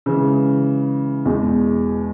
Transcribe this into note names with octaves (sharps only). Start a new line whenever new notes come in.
C#3 E3 G#3
E2 B2 G#3